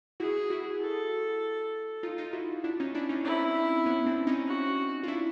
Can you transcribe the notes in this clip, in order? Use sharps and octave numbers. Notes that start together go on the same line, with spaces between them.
E4 F#4 G#4
E4 F#4
A4
D#4 F4
D#4 F4
E4 F#4
D4 E4
C#4 D#4
D4 E4
C#4 D#4
C4 D4 E4
B3 C#4
C4 D4
C#4 D#4
F#4
F4
D4 E4